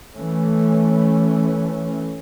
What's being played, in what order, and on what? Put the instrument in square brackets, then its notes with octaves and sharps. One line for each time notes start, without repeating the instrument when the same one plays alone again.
[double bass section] E3 A3 C#4